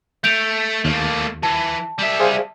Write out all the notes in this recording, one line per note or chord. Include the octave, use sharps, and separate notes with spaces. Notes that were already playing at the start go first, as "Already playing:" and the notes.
A3 G6 D7 F7
D#2 A3 A#3
E3 A5
G3 E5
G#4 C5 F5